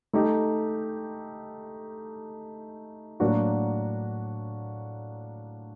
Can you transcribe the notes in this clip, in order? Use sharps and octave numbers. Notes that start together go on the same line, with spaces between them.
A3 D#4 G4
A2 F#3 A#3 D4 F#4